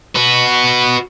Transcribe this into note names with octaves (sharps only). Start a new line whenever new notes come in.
F#4 B4